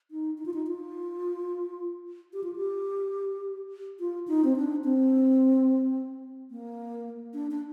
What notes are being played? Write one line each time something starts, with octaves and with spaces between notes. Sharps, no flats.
D#4
D#4
F4
D#4
F4
G4
F4
G4
F4
D#4
C4
D4
C4
A#3
D4
D4